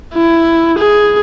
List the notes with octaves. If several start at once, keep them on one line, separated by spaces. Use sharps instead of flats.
E4
G#4